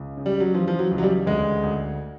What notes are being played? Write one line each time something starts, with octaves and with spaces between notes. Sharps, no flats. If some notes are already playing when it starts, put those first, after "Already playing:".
Already playing: C#2
C#3
G3
F#3
E3 F3
F3
F#3
C#2
F#3
G3
D2 G#3
D2